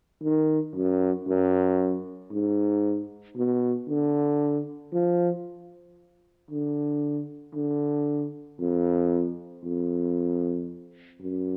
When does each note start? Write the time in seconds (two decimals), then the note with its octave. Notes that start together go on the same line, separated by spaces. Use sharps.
0.23 D#3
0.75 F#2
1.28 F#2
2.32 G#2
3.37 B2
3.89 D3
4.93 F3
6.51 D3
7.55 D3
8.60 F2
9.64 F2
11.21 F#2